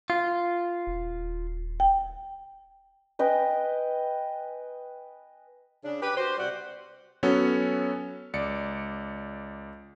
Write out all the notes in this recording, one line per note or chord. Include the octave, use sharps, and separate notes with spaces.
F4
D#1
G5
B4 D#5 G5 G#5
C#3 D4
G4 B4
F#4 G4 C5
C3 G3 F#4 D5 F#5
F#3 B3 C#4 F#4 A4 C#5
C#2 D5 C#7